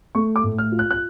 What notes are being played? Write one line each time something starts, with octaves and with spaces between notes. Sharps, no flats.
A3 C#6
D6
A2
F6
F4
F#6
F#6